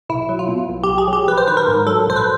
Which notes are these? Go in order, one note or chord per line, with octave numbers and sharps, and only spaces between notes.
B1 E4
F#3
F4
B2
B1
G4
B1
G#4
F#3
G4
A#1 B4
C5
D#3 B4
A#4
G#2
F#3 A4
A#1 C5
B4